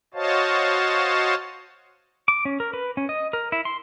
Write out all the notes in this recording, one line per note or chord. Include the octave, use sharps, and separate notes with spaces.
F#4 C5 C#5 D#5 F5 A5
D6
C#4
A#4
B4
C#4
D#5
A#4
E4
C6